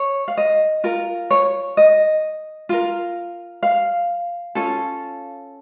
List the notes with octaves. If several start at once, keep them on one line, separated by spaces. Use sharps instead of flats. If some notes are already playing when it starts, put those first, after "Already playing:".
Already playing: C#5
F5
D#5
F4 A#4
C#5
D#5
F4 A#4
F5
C#4 F4 A4